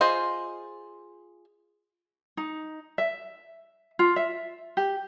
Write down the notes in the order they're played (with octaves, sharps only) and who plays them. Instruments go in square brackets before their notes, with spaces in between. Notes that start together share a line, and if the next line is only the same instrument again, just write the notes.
[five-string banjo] F4 G#4 C5 D#5
[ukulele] D#4
E5
F4
E5
G4